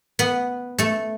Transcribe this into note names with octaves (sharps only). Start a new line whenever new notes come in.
B3 B4
A3 A4